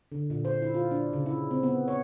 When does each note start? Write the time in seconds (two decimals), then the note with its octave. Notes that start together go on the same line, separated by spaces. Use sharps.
0.12 D3
0.30 A#2
0.45 C5
0.62 E4
0.74 F4
0.91 D4
1.13 C#3
1.26 E4
1.51 C4
1.63 B3
1.88 C#5